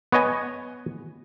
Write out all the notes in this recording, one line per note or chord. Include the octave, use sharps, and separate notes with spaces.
B3 C#5 D#5 G#5